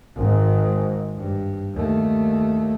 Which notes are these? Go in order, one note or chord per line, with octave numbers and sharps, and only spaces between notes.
G#1 G#2
G2
D#2 A3